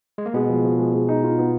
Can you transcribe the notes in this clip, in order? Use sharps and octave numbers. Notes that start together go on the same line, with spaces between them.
G#3
A#3
B2 G#3 B3
F3
F3
G#3
G#3
D#4
F4
B3